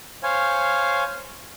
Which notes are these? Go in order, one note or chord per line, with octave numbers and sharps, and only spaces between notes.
C5 C#5 F5 G#5